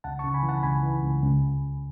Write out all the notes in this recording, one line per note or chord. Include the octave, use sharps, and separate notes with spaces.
C#2 F#5 A5
C#3 A5 C#6
G#5 B5
E3
F#5 A5
C#2 G#5 B5
E3
C#2
C#2